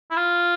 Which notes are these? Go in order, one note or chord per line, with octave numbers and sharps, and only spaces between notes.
E4
F4